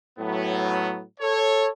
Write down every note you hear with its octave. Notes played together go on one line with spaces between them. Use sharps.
A2 F#3 B3
A4 C#5